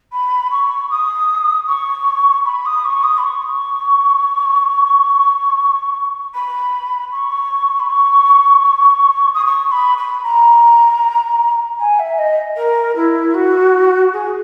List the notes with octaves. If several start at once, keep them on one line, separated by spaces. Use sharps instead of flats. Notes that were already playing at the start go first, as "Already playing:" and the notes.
B5
C#6
D#6
C#6
B5
D#6
C#6
D#6
B5
C#6
B5
C#6
B5
C#6
D#6
C#6
B5
B5
A#5
G#5
E5
D#5
A#4
E4
F#4
G#4